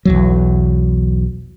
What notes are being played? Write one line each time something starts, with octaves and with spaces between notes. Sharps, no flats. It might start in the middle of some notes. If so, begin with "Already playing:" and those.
B1 E2 F#3